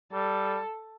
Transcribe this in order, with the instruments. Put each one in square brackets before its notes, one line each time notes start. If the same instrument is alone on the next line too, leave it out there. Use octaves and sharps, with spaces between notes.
[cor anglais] G3 [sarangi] A4